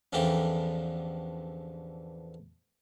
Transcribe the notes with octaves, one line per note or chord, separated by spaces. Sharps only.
A1 E2 D3 E3 F3 G4